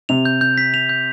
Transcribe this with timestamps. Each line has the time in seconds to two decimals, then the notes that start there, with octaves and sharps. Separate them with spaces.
0.09 C3 F7
0.25 G6
0.41 G6
0.58 B6
0.74 F7
0.89 G6